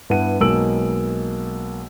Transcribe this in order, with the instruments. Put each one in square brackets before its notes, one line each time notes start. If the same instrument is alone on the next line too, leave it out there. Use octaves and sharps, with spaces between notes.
[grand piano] G2 B3 E4 F#5 D#7
B1 G#3 A#3 E6 D7 F#7